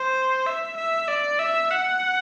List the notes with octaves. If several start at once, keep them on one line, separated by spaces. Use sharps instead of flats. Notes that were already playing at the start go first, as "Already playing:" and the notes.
Already playing: C5
E5
E5
D5
E5
F#5